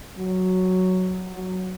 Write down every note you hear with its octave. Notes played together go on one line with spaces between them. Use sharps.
F#3
F#3